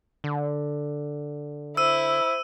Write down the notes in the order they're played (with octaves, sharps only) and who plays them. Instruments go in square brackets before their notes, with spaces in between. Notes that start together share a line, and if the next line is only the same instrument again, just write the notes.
[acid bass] D3
[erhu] E4 [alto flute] C5 [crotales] E6 D#7